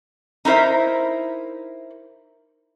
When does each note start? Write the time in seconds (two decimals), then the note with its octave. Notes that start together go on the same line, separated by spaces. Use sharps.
0.45 D#4 E4 A#4 C5 E5